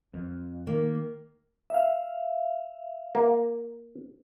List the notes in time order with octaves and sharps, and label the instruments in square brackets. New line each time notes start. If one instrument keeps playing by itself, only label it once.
[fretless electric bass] F2
[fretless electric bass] D#3 [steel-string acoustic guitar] A#3
[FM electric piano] E5 F5
[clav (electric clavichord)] A#3